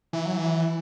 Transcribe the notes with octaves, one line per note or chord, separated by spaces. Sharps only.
E3
F#3
E3